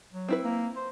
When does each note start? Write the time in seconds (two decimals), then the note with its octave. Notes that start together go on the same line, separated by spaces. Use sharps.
0.12 F#3
0.28 C4 E4 B4
0.43 A#3
0.76 C5